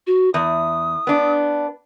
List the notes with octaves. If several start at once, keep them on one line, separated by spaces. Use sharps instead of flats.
F#4
E2 D#6
B3 D4